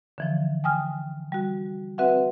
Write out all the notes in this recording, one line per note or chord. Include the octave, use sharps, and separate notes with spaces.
D3 E3 F3
G5 G#5 D#6 F6
G3 F#4
C4 F#4 B4 E5 F#5